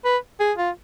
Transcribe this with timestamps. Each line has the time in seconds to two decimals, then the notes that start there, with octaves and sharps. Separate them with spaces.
0.05 B4
0.40 G#4
0.58 F4